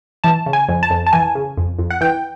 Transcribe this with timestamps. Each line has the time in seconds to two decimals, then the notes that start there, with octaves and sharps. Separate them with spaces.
0.24 E3 A5
0.46 C#3
0.53 G#5
0.68 F2
0.83 A5
0.90 F2
1.07 A5
1.13 E3 G#5
1.35 C#3
1.57 F2
1.79 F2
1.90 F#5
2.01 E3 G5